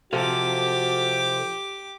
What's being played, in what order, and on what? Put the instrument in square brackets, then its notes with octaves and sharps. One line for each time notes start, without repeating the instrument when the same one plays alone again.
[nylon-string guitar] C3 F3 [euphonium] F#4 [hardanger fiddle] G4 D6 [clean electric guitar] A4 C5 F5